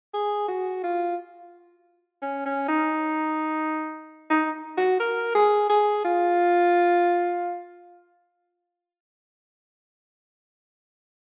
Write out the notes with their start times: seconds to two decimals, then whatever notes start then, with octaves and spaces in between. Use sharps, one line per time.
0.14 G#4
0.48 F#4
0.83 F4
2.22 C#4
2.45 C#4
2.68 D#4
4.30 D#4
4.78 F#4
5.00 A#4
5.35 G#4
5.69 G#4
6.04 F4